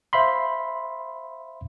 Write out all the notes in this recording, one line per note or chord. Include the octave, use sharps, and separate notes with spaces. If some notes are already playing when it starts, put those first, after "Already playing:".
C5 E5 F5 B5 C6